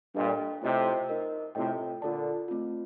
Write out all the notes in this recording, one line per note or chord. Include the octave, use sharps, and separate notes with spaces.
G2 A#2 D4 A4 D#5 G5
A2 C3 F4 C5 D#5 G5
D#4 A#4 D#5
A2 C3 C4 F4 A4 D#5 G5
A#2 D3 F4 A4 D5 A5
A3 C4 F4